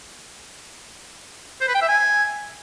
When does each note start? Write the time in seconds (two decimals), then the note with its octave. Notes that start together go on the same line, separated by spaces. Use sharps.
1.61 C5
1.68 B4
1.75 G5
1.82 E5
1.89 G#5